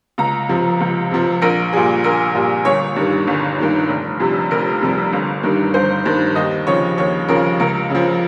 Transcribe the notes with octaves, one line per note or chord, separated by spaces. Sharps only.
C#2 A#5
C3 F3
C#2
C3 F3
A#1 A#4
A#2 G3 G#4
A#1 A#4
A#2 G3
G1 C#5
G2 D#3 G3
G1
G2 D#3 G3
F1
F2 C3 G3
F1 A#4
F2 C3 G3
G1
G2 D#3 G3
G1 C5
G2 D#3 G3
D#2 D#5
C#3 F3 C#5
D#2 C#5
C#3 F3 A#4
C#2 A#4
C#3 F3